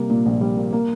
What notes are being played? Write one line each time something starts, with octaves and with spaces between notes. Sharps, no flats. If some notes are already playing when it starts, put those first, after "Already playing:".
Already playing: C3 G3 A#3
A#2
A#1
G3
A#3
A#3